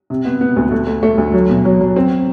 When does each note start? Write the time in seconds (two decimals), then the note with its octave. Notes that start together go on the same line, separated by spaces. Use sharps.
0.10 C3
0.25 B3
0.41 B3
0.56 D2
0.72 A3
0.87 A3
1.03 A3
1.18 D2
1.33 F#3
1.49 B2
1.65 F#3
1.81 F#3
1.96 C4